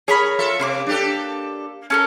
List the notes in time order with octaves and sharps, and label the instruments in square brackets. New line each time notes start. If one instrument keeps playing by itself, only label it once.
[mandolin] G#4 A#4 B5 [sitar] C#5
[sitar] F4 A4 E5
[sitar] C3 [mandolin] A#3 C6 D6
[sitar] D4 G4 A4
[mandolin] C#4 A4 A#4